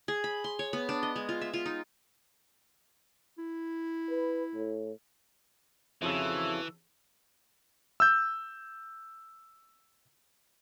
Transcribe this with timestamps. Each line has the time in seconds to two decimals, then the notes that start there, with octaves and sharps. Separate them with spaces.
0.08 G#4
0.24 B5
0.44 C6
0.59 C#5
0.73 B3
0.89 D4
1.03 D#5
1.16 G#3
1.29 F4
1.41 E5
1.54 F4
1.66 D#4
3.38 E4
4.10 B4
4.55 A2
6.02 F2 C#3 E3 E4 F#4 A4
8.00 E6 G6